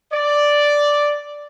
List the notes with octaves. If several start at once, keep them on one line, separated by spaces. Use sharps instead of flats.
D5